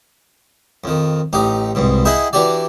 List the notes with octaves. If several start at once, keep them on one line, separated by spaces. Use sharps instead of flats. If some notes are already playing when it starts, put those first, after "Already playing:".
F2 D#3
A1 D#4 G4
C2 G#2 B2
E4 G#4 D#5 F#5 G5 B5
E3 D4 F#4 G4 D5